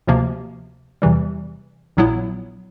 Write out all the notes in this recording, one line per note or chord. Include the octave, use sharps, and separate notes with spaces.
D2 C3 F3 A#3
E2 C3 E3 G3
A#1 A#2 F#3 B3 E4